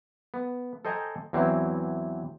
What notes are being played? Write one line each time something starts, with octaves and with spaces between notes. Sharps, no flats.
B3
A4 C5 D#5 G5 G#5 A#5
E2 E3 F#3 C4 E4